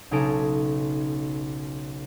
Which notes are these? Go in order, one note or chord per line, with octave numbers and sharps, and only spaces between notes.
B1 C#3 C#4 D#4 A4 D7